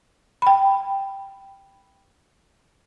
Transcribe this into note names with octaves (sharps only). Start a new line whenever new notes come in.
G5 B5